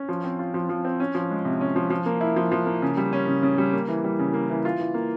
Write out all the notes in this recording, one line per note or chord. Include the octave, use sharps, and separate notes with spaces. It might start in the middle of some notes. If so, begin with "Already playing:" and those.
Already playing: C#4
F3
C4
F4
F3
F3
C4
C#4
F3
G#3
C3
C#4
F3
F3
A#3
E4
F3
F3
A#3
C#3
G3
C#4
C#3
C#3
G3
A#3
E3
G3
C#3
A#3
E3
F4
E3
A#3